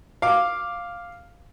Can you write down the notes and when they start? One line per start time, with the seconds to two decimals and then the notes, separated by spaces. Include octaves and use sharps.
0.22 F5 D6